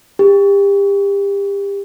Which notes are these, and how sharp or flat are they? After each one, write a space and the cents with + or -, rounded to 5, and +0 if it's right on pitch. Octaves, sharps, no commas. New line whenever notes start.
G4 +30